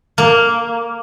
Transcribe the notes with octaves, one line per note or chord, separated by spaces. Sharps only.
A#3